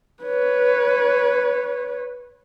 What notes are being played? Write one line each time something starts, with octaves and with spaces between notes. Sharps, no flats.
B4 C#5